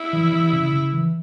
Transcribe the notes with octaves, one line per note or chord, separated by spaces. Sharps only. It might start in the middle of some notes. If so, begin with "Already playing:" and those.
Already playing: E4
E3
E3
C#3
C#3
E3